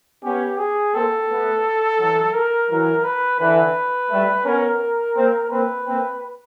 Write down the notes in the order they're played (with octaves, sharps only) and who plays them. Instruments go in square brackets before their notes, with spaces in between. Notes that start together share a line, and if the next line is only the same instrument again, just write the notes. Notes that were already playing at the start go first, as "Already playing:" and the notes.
[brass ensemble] B3 C#4 [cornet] G4
[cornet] G#4
[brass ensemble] A#3 C4 [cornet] A4
[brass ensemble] A3 B3
E3 F#3
[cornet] A#4
[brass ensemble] E3 F#3
[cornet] B4
[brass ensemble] D3 E3 [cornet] B4
[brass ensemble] G3 A3
[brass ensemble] B3 C#4 [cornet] A#4
[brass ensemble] A#3 C4
[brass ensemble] A#3 C4 [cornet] B4
[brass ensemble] A#3 C4